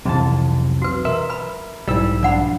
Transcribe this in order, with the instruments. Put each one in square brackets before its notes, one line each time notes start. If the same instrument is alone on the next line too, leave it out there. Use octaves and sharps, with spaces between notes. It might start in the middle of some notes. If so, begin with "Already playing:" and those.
[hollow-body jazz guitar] B1 E3 A5 [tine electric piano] F2 C3 C4
[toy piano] F#4 B4
[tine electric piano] A#4 [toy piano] B4 [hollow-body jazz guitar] E5
[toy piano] B4 B5
[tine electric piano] B1 G#2 E6 [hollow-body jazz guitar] G3 E4
[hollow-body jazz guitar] F3 D4 [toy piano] D5 F#5 B5